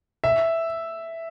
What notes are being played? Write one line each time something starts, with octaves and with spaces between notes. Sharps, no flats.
E5